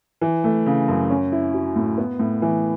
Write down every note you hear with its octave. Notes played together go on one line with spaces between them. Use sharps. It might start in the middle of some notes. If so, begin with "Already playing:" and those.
E3
A3
C#3
F#2
C#4
E4
F#3
A2
B3
A2
E3